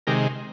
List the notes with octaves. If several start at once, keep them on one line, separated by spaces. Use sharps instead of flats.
C3 D#3 G#3 G4 A#4